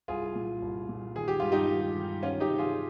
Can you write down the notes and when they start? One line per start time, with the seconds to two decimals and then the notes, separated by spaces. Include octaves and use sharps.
0.08 C2 F4 G#4
0.35 A#2
0.62 C2
0.89 A#2
1.16 D#3 G#4
1.28 G4
1.40 G2 F4
1.52 D#4 G4
1.69 D#3
1.96 D#3
2.23 D#3 C#4 F4
2.40 D#4 G4
2.49 C3
2.58 F4 G#4